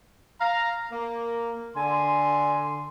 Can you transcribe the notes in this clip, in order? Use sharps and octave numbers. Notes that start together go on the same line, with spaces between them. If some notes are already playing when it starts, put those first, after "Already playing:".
F5 A#5
A#3
D3 G#5 C6